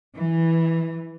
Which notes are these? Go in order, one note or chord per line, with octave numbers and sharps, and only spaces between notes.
E3